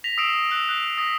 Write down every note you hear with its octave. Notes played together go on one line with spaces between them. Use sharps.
A#6 B6 F7
D#6 E6 C7 D7 E7
E6 F#6
F#6
D#6 A#6 B6